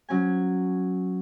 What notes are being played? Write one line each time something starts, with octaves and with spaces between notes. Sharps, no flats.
F#3 C#4 G#5